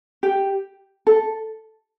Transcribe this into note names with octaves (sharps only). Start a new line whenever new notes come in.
G4
A4